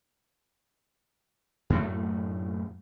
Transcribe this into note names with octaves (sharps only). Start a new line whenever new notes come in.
F#2 A2 A3